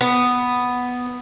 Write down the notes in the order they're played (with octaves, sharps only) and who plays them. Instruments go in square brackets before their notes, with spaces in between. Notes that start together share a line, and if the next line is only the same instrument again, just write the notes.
[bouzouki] B3